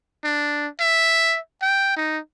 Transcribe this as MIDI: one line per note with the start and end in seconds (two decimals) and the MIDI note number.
0.24 0.68 62
0.80 1.38 76
1.62 1.94 79
1.96 2.19 63